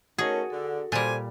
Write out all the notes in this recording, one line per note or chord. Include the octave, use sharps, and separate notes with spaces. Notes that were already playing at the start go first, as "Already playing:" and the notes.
A3 C#4 D#4 F#4 G#4 A#4 C#5 A5
D3 A4
A#2 G3 C5 D5 G#5